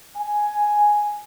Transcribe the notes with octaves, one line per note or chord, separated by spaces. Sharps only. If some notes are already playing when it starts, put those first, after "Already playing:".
G#5